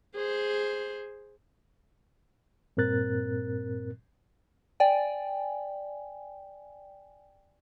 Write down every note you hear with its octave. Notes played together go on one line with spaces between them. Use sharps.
G#4 C5
G2 A#2 C4 A#4 F#6 A6
D5 G5 G#5